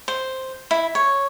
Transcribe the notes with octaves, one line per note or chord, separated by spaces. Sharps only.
C5
E4
C#5